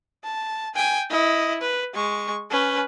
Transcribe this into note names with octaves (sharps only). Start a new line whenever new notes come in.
A5
G5 G#5
E4 D#5
B4
G#3 C#6
C#4 B4